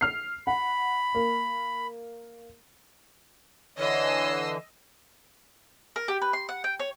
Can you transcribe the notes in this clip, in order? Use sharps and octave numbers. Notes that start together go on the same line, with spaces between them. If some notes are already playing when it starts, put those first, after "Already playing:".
F6 C7
F#5 B5
A#3
D3 E3 C#5 D#5 E6 C7
A#4
G4
B4
C6
F#5
G5
C#5